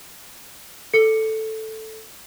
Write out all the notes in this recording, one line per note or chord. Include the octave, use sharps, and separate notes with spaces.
A4 C#7